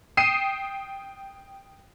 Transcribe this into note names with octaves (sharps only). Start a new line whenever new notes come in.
G5 D#6 C7 D#7 E7